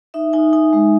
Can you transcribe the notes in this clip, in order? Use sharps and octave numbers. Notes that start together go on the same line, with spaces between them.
D#4 E5
D#4 G#5
D#4 G#5
G#3